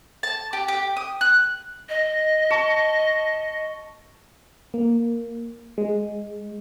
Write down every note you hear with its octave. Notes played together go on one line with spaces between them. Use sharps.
A5
G4
G4
D#6
F#6
D#5
A5 C#6
A#3
G#3